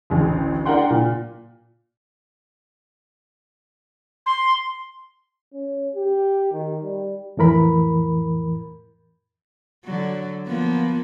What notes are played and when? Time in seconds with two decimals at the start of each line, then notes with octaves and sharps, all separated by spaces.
0.10 A1 D2
0.65 D4 A#4 F#5 G5 C6
0.90 A#2
4.26 C6
5.54 C#4
5.95 G4
6.52 D#3
6.83 G3
7.37 F2 A2 E3 A#4 B5
9.85 D3 F#3
10.47 F3 A#3 B3